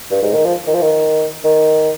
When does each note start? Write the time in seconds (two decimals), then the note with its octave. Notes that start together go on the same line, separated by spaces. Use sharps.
0.11 G2
0.22 G#2
0.33 D#3
0.45 F3
0.67 D#3
0.74 F3
0.81 D#3
1.44 D#3